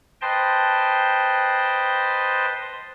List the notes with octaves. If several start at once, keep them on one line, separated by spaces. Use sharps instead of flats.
B4 C5 D#5 G5 A5 C6